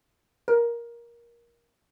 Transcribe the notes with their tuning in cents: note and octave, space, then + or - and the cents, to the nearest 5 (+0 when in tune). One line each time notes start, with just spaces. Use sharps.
A#4 +15